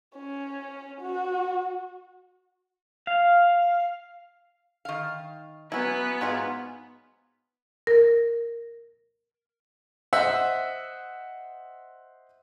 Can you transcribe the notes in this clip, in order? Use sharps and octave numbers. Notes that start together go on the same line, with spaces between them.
C#4
F#4
F5
D#3 F5
F#3 B3 C#4 E4 B4
G#2 F#3 F4 G#4
A#4
C5 D#5 E5 F#5 E6